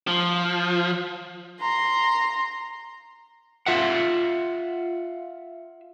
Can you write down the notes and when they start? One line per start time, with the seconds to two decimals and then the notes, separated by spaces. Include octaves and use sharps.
0.07 F3
1.60 A#5 C6
3.66 F4 E5 F#5